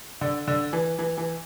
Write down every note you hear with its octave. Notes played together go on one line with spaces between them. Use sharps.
D3
D3
E3
E3
E3